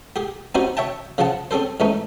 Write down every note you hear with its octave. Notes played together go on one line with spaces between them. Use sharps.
G4 G#4
C4 C#4 D#4 F#4 G4 C5
C#5 E5 G5 A5
C#3 F3 G#4 F#5 A5
C4 C#4 G#4 A4 C5
G#2 E3 A3 C#4 D#4